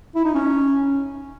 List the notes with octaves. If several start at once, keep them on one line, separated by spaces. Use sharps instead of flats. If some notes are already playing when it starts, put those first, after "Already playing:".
E4
D#4
C#4